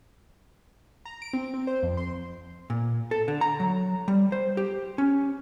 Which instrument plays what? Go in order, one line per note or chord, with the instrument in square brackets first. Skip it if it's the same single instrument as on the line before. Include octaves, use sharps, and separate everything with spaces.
[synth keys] A#5
D7
C4
C4
C5
F2
C6
[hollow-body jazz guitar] A#2
A4
D3
A#5
F#3
G3
C5
G4
C#4